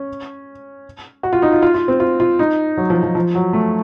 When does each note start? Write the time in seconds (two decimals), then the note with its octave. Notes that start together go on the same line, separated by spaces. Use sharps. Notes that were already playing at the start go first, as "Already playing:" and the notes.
Already playing: C#4
1.23 F#4
1.33 F4
1.42 D#4
1.52 F4
1.63 F4
1.74 F4
1.88 C4
2.00 F4
2.20 F4
2.39 D#4
2.77 F#3
2.90 F3
3.03 F3
3.15 F3
3.35 F#3
3.53 A3